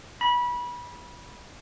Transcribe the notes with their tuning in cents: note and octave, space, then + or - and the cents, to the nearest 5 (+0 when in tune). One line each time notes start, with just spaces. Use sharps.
B5 -25